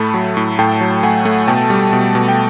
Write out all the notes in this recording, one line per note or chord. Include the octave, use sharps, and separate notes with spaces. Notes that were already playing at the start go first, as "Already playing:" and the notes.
Already playing: A2 A3 A5 B5
F#3
A2
A2 G5 A5
F#3
A3 F#5 G#5
A3
B2 G5 A5
G3
B2
B2
G5